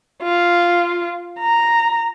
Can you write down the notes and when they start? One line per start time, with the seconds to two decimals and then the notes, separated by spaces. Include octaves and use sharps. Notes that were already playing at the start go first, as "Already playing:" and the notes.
0.23 F4
1.40 A#5